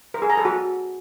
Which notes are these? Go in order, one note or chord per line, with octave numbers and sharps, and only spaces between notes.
A#4
G#4
A#5
A4
F#4